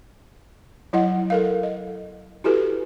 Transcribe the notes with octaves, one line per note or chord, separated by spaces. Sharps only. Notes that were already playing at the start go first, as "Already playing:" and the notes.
F#3 E4 D#5 F#5
A4 A#4 F5
D#5
E4 F#4 G4 A4 B4